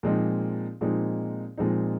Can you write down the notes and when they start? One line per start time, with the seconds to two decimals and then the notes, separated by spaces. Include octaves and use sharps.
0.03 A#2 F3 G#3 C4 D#4
0.81 A#2 F3 G#3 C4 D#4
1.58 A#2 F3 G#3 C4 D#4